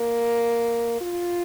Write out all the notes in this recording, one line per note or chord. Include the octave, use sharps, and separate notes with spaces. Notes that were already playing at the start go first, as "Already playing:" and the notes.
Already playing: A#3
F4